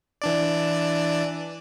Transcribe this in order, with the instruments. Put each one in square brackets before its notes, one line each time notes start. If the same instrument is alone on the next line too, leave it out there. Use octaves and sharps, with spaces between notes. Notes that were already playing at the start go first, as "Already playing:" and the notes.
[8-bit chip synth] E3 D4 D5